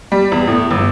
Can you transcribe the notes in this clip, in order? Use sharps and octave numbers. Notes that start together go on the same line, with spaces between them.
G3
E2
A2
G1